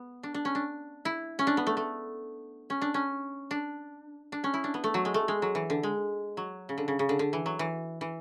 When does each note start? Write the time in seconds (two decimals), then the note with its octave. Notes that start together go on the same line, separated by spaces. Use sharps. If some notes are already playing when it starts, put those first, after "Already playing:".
Already playing: B3
0.23 D4
0.34 D4
0.45 C#4
0.55 D4
1.05 E4
1.39 C#4
1.47 D4
1.57 B3
1.67 A3
1.77 A3
2.70 C#4
2.82 D4
2.94 C#4
3.51 D4
4.32 D4
4.44 C#4
4.54 E4
4.64 D4
4.74 B3
4.84 A3
4.94 F#3
5.05 G#3
5.14 A3
5.28 G#3
5.42 F#3
5.55 E3
5.70 D3
5.83 G#3
6.37 F#3
6.69 C#3
6.78 D3
6.88 C#3
6.99 C#3
7.09 D3
7.19 D3
7.33 E3
7.46 F#3
7.59 E3
8.01 E3